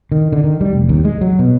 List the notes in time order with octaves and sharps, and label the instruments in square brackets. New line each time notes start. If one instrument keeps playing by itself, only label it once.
[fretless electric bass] D#3
D3
D#3
G3
F1
D#2
G#3
F#3
B2